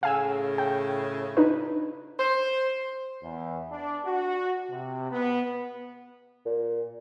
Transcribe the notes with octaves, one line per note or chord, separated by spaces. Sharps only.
A2 C#3 F5 G#5 E6
G5
D4 D#4 B4
C5
E2
D4
F#4
C3
B3
A#2